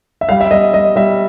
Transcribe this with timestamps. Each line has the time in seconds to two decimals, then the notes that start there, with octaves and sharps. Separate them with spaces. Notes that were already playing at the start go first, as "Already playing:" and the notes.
0.21 E5
0.29 G3 F5
0.41 E5
0.51 G3 D#5
0.73 G3 D#5
0.96 G3 E5